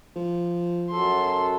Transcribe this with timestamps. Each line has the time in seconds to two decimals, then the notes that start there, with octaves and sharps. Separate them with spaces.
0.16 F3
0.91 F#2 F#3 A4 C6